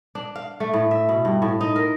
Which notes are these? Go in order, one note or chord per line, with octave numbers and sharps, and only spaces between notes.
D4
F5
A3
A2
E5
B2
G2
A2
D#4
A#4